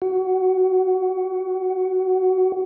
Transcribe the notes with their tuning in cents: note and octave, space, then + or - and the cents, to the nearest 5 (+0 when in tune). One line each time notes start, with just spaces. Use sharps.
F#4 +15